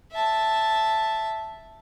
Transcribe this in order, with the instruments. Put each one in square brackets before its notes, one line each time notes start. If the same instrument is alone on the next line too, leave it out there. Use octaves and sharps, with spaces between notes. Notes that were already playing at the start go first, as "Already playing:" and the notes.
[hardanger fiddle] E5 A5